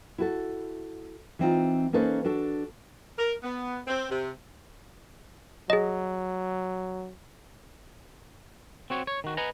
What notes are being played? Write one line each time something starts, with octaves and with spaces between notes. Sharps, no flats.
E4 F#4 A4
E3 C4 D#4 F4
A#3 C#4 D#4 A4 B4 C5
D4 F#4 A4
A#4
B3
C4
C3
F#3 G#4 D#5
C4 F#4 C#5
C#5
D#3 F#4
B4 D#5 F#5 G#5 A#5